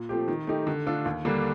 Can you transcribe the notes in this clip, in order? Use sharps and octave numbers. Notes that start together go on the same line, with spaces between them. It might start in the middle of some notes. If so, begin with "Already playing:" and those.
Already playing: A#2
F3 A3 C4 G4
D#3
A3 D#4 G4
D3
A3 D4 F4 A4
D#2
D3 G3 A#3 D4